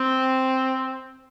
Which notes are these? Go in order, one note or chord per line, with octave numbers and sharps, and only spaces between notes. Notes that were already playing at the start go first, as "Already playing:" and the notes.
Already playing: C4